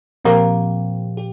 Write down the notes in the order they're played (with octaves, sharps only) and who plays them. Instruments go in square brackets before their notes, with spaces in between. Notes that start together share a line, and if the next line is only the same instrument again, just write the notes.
[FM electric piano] A#2 F3 C4 G4 [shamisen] A#3
[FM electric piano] G4